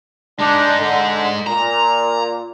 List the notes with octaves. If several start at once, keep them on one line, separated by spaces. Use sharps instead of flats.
G#3 D4 D#4
D3
A#2 A#5